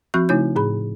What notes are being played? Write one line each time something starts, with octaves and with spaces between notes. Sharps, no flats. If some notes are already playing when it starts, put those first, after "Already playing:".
F3 C4 F#4 C#6 F#6 G6
C#3 A3 D#4 E4 C#5 G6
A2 G#4 B5